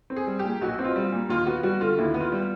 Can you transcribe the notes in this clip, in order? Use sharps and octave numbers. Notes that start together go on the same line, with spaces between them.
C4
G#4
G3
G4
A#2
B1 F#4
C4
F4
G3
A#2
D#2 F4
B3 F#4
G3 F#4
D3 F4
D#2 E4
B3
F4
G3